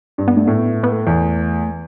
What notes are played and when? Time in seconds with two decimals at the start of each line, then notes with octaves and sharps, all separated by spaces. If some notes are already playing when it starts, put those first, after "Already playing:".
0.18 G2
0.28 B3
0.36 G2 A3
0.47 A2 B3
0.83 B3
0.92 A3
1.07 E2